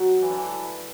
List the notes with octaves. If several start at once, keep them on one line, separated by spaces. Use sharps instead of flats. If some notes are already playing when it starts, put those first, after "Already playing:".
Already playing: F#3
E3
D3
E3